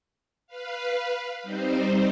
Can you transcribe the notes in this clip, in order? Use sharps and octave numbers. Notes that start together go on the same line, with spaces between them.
B4 F5
G3 C4 D#4 C5